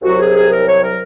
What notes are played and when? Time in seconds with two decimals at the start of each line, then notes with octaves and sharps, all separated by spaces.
0.02 C2 C3 F#3 F#4
0.18 G#4
0.34 G#4
0.50 A#4
0.66 C#5
0.82 A#4